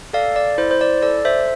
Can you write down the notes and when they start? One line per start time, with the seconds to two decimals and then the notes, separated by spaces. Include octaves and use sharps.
0.13 A4 D5 F5
0.36 D5
0.58 E4 C5
0.71 C5
0.81 D5
1.02 A4 D5
1.25 C5 E5